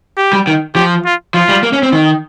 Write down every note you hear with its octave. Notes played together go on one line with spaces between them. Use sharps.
G4
G3
D#3
F3 G4
F4
F3 F4
G3
A#3
C#4
C4
D#3